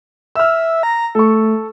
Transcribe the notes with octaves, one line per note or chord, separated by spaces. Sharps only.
E5 E6 F6
A#5
A3 A4 C#6